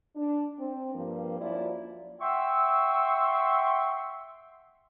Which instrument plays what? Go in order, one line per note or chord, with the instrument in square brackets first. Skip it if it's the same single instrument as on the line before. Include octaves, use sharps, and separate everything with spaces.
[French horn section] D4
C4
G2 F3 A#3
F#2 F3 A#3 E4 F4 D5
[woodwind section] E5 F#5 G5 C6 C#6 E6